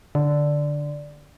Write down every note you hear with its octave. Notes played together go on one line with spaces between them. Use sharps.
D3